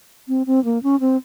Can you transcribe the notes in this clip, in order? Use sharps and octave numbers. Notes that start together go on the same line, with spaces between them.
C4
C4
A#3
C#4
C4